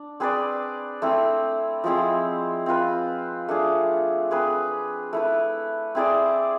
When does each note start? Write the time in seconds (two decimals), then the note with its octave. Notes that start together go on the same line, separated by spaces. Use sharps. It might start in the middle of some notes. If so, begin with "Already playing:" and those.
Already playing: D4
0.20 C4 G#4 B4 D5
1.02 A3 C4 E4
1.84 F3 G#3 C4 E4
2.66 C4 F4 B4
3.48 A3 D4 G#4
4.31 C4 G#4 B4
5.13 A3 E4 B4
5.95 C4 E4 G#4 D5